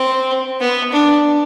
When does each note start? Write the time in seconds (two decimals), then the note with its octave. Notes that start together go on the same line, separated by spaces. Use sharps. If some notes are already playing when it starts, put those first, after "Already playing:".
Already playing: C4
0.60 B3
0.92 D4